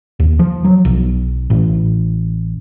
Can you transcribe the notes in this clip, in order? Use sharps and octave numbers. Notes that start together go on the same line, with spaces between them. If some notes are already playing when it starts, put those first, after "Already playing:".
D#2
F3
F#3
B1
A1